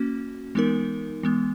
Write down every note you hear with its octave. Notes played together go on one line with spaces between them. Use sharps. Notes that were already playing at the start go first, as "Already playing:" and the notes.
Already playing: A#3 C#4 F#4
E3 G#3 B3 D#4 A#4
E3 G#3 B3